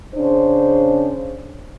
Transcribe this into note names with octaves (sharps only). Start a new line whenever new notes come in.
C#3 D4 C5